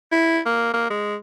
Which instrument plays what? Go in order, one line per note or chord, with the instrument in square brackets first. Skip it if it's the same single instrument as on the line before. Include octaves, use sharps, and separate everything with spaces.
[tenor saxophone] E4
A#3
A#3
G#3